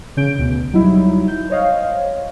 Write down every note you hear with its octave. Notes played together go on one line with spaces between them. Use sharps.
C#3 C#4 G6 D7
D2 B2
F#3 G3 D#4 E4
G6
C5 C#5 D#5 F5